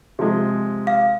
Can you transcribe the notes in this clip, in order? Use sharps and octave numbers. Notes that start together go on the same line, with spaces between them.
C3 F3 G#3
F5